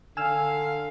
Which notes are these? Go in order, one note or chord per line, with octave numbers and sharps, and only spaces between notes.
D3 F5 G#5 E6 F6